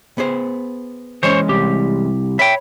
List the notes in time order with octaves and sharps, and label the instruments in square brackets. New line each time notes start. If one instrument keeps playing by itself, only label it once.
[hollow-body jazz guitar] B3 G#4 C5
[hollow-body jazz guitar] E3 G#3 C#4 [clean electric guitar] C5 C#5
[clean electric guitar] C2 G4
[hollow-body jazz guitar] C#5 B5 [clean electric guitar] E5 G5